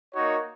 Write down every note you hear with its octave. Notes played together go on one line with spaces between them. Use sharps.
A#3 D#4 F#4 C#5